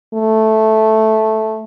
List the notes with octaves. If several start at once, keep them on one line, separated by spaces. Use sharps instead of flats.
A3